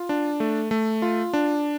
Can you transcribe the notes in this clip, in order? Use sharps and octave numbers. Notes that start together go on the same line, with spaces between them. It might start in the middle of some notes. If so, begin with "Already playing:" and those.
Already playing: F4
D4
A3
A3
F4
D4